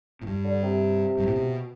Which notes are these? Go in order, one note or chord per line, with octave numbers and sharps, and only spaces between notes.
A2
G2
D3
C3
G2
A2
B2